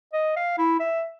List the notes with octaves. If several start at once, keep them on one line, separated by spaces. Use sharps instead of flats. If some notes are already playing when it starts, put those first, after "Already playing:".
D#5
F5
E4
E5